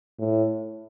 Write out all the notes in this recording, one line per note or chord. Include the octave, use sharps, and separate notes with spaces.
A2